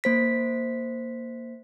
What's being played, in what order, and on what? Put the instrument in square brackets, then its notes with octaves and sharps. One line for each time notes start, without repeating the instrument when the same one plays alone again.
[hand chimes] A#3 C5 B6